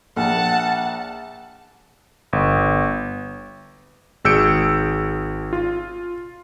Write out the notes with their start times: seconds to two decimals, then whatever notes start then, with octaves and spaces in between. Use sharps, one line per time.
0.16 A#1 F#5 A5
2.33 G1
4.25 G#1 G#4 E6 G6 C#7 D7
5.53 F4